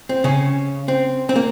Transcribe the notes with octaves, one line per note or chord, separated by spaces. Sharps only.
C4
C#3 C#4
C4
C4
A#3